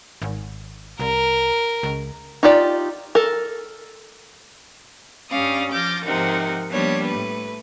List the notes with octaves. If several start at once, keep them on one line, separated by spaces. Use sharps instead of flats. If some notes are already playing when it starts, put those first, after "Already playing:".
G#1
C2 A#4
C#2
D#4 F4 G4 D5
A4 A#4
G2 G3 C#4 D5 F5 D#6
F3 D6 F6 G6 A6 A#6
G#2 C3 F3 D#4 A#4 F#5
F3 G3 A#3 B3 D4 C#5
A2 B4